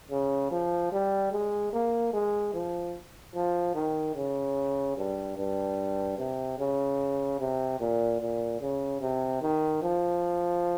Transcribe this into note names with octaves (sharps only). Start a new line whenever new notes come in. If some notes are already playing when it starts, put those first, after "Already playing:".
C#3
F3
G3
G#3
A#3
G#3
F3
F3
D#3
C#3
G2
G2
C3
C#3
C3
A#2
A#2
C#3
C3
D#3
F3